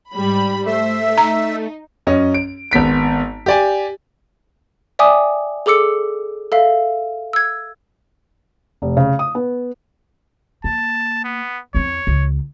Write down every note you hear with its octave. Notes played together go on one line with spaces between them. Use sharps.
G#2 G3 B5
A3 C5 E5
D#4 A#5
F#2 C#4 D#5
D7
G#1 B3 B6 D7
G4 D5 G#5
D5 E5 G5 G#5 D6 D#6
G#4 A4 D6 E6 C#7
A4 E5 F5
E6 G#6
F1
C#3
D#6
B3
A#3 A5
B3
E2 C4 C#5
C#2